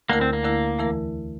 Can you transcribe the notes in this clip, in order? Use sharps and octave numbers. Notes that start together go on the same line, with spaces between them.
D2 D3 A3 A#3 E4 A#4
C4
A#3
D2 D3 A3 E4 A#4
E2 E3 A3 E4 A#4